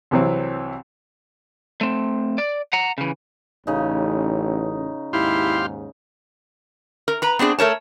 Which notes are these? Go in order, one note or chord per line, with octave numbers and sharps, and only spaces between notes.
C2 C3 E3 F#3 C4
A3 C4
D5
F#5 A#5
C#3 E3
A1 C#3 D#4
D#2 G#2 E4 G4 F5 C6
A#4
B4 A#5
B3 C4 D4 G#4
A3 A#4 C#5 A5